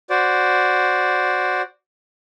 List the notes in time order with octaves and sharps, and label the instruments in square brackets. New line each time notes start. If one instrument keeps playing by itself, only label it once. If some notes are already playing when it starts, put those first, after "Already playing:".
[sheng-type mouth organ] F#4 C5 D5